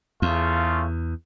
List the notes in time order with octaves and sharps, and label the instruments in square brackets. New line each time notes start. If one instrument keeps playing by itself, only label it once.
[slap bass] E2 [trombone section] C#3 A3 F4